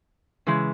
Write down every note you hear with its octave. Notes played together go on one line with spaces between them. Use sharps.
C#3 E3 G#3